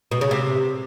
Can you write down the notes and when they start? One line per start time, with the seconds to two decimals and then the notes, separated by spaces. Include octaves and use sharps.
0.11 B2
0.21 C#3
0.31 C3